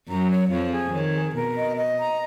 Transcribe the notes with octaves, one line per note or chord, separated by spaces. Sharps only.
F#2 F#3 A#5
C#5
F2 F3 C#5
G#4
D#3 C#5
G#4
B2 A#4
D#5
D#5
A#5